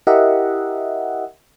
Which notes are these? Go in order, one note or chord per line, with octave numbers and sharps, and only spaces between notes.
E4 G4 A#4 D#5 E5 F#5